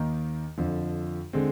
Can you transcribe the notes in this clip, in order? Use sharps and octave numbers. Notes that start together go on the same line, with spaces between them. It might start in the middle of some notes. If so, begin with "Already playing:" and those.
Already playing: D#2 D#3 A#3 D#4
F2 D3 F3
D3 G#3 C4